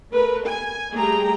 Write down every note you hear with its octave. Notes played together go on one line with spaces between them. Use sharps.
A3 A#4 B4
G#5
G3 A3 G#4 G5 A#5